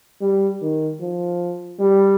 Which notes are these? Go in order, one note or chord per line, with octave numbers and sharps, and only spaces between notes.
G3
D#3
F3
G3